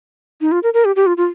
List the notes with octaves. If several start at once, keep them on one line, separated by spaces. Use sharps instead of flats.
D#4
F4
A#4
A#4
G4
G4
F4
F4